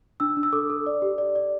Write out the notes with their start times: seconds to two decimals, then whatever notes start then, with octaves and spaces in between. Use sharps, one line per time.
0.20 D4 E6
0.37 D4
0.43 E6
0.53 A4 D6
0.70 A4
0.86 D5
1.02 G4
1.18 D5
1.35 D5